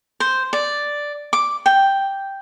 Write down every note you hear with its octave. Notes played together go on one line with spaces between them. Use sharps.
C5
D5
D6
G5